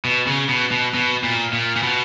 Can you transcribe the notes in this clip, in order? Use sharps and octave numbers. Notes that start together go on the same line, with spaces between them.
B2
C#3
B2
B2
B2
A#2
A#2
A#2
B2